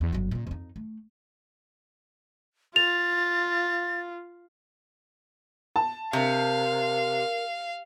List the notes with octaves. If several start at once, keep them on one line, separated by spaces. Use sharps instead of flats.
E2
G1 F#3
A#2 C#3
F2 D#4
A3
F4 A6 F7
A5
C3 A#4 F5